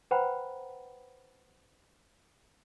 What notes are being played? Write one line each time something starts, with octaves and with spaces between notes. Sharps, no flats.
B4 C5 F#5 G5 A#5 B5